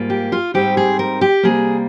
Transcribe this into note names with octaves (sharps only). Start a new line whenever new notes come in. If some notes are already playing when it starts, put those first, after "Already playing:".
Already playing: G#2 G3 A#3 F4
G4
F4
G#2 G3 C4 D#4 G4
G#4
A#4
G4
C3 G3 A#3 G#4